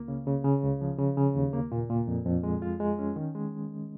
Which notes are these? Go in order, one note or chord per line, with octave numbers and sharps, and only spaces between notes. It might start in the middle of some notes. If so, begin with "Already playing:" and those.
Already playing: C#2 A#3
C#3
C#3
C#3
C#2
F3
C#3
C#3
D#2
A#3
A#2
A#2
F2
F2
G#3
F4
G#3
C#4
D#3
G#3